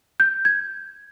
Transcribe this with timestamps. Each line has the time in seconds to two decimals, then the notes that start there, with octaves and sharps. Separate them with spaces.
0.20 G6
0.45 G#6